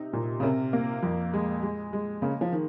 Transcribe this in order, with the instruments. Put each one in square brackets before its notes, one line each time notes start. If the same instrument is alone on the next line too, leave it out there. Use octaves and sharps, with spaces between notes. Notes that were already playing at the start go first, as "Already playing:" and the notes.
Already playing: [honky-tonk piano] C3 D#4
A#2
[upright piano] C#3
[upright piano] C3 [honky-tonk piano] A#4
[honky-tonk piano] A#3
F2
G#3
G#3
G#3
[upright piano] C#3 [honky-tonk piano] A#3
[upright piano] F3
D#3